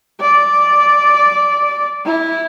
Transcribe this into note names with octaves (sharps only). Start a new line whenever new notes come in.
D5
E4